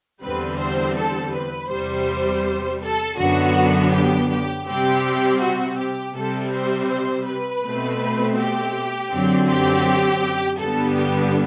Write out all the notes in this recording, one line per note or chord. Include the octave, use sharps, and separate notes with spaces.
E2 D3 G3 C4 B4
C5
A4
B4
E2 C3 G3 C5
A4
F#2 D3 F#3 B3 F#4
G4
G4
C3 G3 C4 G4
F#4
G4
C3 G3 C4 A4
C5
C5
B4
B2 A3 C4
G4
F#2 D3 F#3 C4
G4
G2 D3 G3 B3 A4
G4